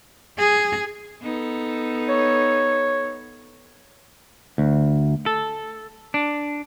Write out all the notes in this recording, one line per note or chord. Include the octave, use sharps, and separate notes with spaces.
G#4
B3 D#4 A4
C#5
D2
A4
D4